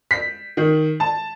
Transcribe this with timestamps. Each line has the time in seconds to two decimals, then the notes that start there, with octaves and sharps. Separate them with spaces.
0.11 B6
0.57 D#3
1.00 A5